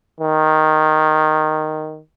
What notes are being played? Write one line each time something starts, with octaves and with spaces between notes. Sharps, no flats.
D#3